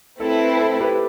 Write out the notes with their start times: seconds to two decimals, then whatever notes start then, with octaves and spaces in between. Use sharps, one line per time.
0.20 A3 C4 E4 A4 B4
0.60 A4
0.80 G4 B4